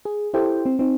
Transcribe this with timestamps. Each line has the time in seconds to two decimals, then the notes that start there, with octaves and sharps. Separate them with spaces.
0.05 G#4
0.34 E4 G4 A4 C5 G5
0.66 C4
0.79 C4 D#4